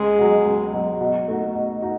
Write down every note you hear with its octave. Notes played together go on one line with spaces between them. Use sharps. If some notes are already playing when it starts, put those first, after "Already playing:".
Already playing: C#2 G#3
B2 F#3
C#2
B2 F#3
B2
A3 D#4 F#4
B2
D#4 F#4